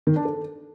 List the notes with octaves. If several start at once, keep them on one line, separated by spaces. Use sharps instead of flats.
D#3
D4
A4